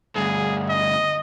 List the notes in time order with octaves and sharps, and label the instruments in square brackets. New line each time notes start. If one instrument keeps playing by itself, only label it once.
[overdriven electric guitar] D2 G2 [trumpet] G#4
[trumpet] D#5